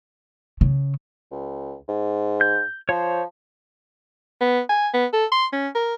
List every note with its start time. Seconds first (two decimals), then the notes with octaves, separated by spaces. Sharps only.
0.61 C#3
1.31 C#2
1.88 G#2
2.41 G6
2.89 F3 C5 C#5
4.41 B3
4.69 G#5
4.94 B3
5.13 A4
5.32 C6
5.53 C#4
5.75 A#4